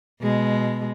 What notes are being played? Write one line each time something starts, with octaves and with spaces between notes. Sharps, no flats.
B2 G#3